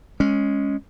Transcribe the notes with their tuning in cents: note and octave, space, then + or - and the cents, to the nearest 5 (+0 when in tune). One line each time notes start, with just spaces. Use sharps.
G#3 +0 C#4 +0